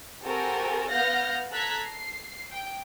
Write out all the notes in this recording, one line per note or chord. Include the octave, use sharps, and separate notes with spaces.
C4 F#4 G4 A4 A#4 G#5
B3 F5 F#5 F6 G6 A#6
A4 A5 A#5 F#6 G#6 B6
C7
G5